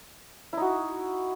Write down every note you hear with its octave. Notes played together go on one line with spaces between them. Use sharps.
D#4 E4 F#4